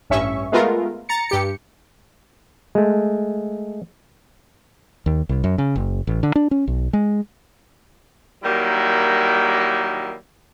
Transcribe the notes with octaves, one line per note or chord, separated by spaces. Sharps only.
A1 G2 C#4 E5 C#6
G#3 A3 B3 F4 A#4
A#5 A6 C#7
G2 G4 C#7
G#3 A3
D#2
C2
F#2
C#3
F#1
A1
D3
D4
C#4
B1
G#3
D#3 F#3 G3 A#3 E4